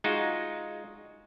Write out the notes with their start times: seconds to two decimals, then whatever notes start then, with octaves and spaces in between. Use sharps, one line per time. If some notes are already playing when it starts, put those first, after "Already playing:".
0.04 G#3 D#4 F4 F#4